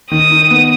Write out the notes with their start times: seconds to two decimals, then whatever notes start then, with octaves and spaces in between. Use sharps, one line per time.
0.11 D#3 D#6
0.31 D#4
0.50 B3